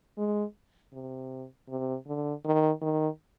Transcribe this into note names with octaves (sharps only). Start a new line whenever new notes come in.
G#3
C3
C3
D3
D#3
D#3